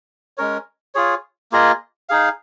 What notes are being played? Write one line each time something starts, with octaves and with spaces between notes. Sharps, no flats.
G#3 C#4 A#4 C#5
F4 G#4 C#5
A#3 F4 G#4 D#5
D#4 G#4 F5